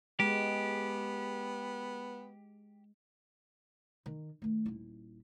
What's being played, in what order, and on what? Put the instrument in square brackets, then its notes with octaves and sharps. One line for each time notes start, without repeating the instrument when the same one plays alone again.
[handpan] G#3 [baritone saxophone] B3 [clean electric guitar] G4
[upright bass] D#3
D#3 A3
D#1 E4